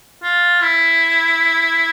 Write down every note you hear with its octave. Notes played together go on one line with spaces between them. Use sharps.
F4
E4